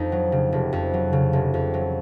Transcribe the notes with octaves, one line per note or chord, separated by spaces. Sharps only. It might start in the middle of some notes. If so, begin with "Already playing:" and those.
Already playing: F2 D#4
F#3
C#3
F1
F2
F#3
C#3
F1
F2
F#3